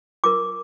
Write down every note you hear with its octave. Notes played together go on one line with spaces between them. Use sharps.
F4 A#4 D6